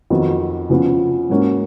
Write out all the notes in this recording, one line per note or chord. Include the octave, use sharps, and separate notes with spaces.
F2 D#3 F#3 B3
C#3 F3 B3
G#2 F#3 A#3 C#4 F#4